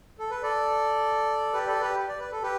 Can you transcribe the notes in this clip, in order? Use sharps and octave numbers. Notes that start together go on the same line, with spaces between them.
A4
B4
A4 D5
G4 B4
A4 D5
G4 B4
D5
B4
A4
G4 B4